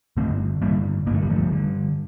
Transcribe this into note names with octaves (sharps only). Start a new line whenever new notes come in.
G2 D3 A3 C4
G2 D3 G3 A#3
G2 D3 A3 A#3
G3
F3 A3
G2 D3